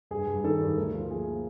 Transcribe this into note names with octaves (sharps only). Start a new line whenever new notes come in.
G2 G#4
G2
D#3 A4
G2
D2 A#4
F3
A#3 G#4
A#3